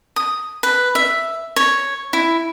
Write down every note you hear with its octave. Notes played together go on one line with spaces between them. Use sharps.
D#6
B4
E5
C#5
E4